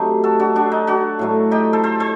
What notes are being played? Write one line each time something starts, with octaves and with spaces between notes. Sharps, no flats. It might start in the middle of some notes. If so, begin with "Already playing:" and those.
Already playing: C3 F#3 A3 D#4 G4
F#4 A4
D4 F#4
D4 F#4
D#4
D4 F#4
A2 F#3 A3
D#4 G4
A4 C5
A4 C5
A4 C5